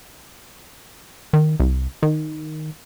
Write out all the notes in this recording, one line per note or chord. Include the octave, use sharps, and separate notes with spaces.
D#3
C2
D#3